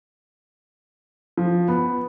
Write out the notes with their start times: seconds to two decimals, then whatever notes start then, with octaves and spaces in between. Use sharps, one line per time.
1.37 F3
1.68 B3